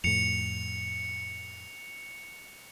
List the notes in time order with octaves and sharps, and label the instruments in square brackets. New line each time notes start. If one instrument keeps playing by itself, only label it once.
[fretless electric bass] F2 A2 [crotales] C#7 F7